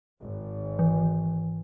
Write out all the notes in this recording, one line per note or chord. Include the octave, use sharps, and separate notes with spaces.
G#1
E3